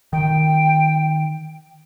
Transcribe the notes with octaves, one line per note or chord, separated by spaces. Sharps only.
D#3 G5